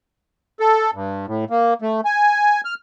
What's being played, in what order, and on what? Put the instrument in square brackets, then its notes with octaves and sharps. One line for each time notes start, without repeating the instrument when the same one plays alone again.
[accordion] A4
G2
A2
A#3
A3
G#5
F6